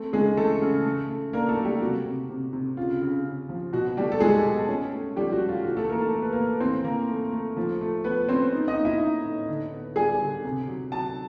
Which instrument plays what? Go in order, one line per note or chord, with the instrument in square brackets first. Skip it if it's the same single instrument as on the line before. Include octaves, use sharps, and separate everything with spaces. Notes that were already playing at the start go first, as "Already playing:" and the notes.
Already playing: [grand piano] A3 C4
C#3 G#3 G#4
E3 A3 A4
C#3
A3
A3
A#3 D4 A#4
A3 A4
F#3
G3 G4
C3 F#4
C3
C3
C3
C#3 F4
C#3
C#3
F3
B2 F#4
G3 A3 G4
A4
F#3 G#3 G#4
B2
C#4
A3
F3 G3 G4
F#4
A3
F4
E3 F#4
A3 A4
E3 A#3 A#4
A3 A4
B3 A#4
B4
A#3 A#4
B3
E3 C4 C5
E3 A#3 A#4
A3
A3
F3
A3
F3 B3 B4
C4 C#4 C5
D#4
D#4 D#5
A#3
E4 E5
D#4
A2
D3
B3
G3 G#4 G#5
D3
C3
F#3
F#3 A5